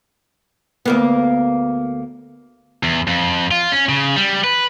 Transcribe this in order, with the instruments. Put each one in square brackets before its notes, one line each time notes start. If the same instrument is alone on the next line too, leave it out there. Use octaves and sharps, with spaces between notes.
[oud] D2 A#3 B3
[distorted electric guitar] E2
F2
F4
C#4
C#3
G3
B4